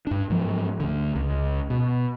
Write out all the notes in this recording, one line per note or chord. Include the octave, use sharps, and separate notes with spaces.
G2 D4
G#2 F3 F#3
D2 D3
C#2
B2